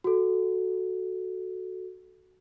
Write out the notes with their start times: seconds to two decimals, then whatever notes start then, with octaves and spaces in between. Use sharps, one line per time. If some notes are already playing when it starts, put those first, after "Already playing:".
0.04 F#4 A4